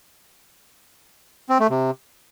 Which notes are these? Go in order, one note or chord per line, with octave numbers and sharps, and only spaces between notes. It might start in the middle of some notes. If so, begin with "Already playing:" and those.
C4
A3
C3